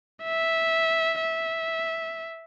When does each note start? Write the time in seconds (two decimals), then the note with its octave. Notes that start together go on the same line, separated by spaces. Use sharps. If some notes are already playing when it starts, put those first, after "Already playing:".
0.24 E5
1.21 E5